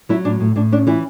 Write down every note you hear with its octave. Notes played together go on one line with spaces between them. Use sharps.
F#3 E4
A2 D4
A2
A2 D4
C#4 D4
E3 E4